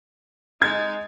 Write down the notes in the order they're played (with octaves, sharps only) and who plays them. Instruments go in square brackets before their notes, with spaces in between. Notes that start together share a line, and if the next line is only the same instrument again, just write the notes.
[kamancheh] G#3 D#4 [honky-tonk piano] G#6 A6